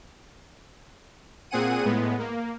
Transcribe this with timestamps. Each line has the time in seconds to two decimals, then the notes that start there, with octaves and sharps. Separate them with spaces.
1.51 A#2 C4 G#4 F#5 D#7
1.85 A2 G#3 B3
2.19 A#3